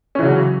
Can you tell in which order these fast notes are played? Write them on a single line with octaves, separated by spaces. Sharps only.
C#4 E3 C#3 F#3